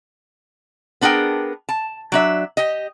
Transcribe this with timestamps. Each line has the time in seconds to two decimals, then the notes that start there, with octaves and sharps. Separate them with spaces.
1.01 B3 D4 G#4 A#4 G5
1.69 A5
2.12 F#3 D4 E5
2.57 G4 D#5